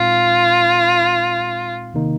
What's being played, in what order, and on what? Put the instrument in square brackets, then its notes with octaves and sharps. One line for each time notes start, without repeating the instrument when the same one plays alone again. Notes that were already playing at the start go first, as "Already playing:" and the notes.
Already playing: [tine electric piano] A#2 G#3 C4 D#4 [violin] F4
[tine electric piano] C3 D#3 A#3 D#4